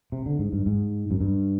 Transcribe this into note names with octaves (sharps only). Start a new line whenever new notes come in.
C3
D3
G#2
G2
G#2
F#2
G2